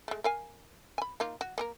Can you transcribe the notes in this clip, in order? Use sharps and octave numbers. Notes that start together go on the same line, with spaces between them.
G#3 A3
A#4 F5 G#5
G#5 B5
A#3 D#4 F4
F#4
A#3 G#4 A#4